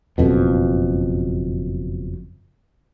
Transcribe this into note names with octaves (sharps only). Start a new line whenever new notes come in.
F#1 F2 B2